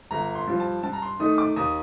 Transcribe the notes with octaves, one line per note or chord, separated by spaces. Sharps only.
G1 A#5
C6
G2 F3
A5
G2 A5
A#5
C6
D#3 A3 D#4 D#6
D6
D#2 D#6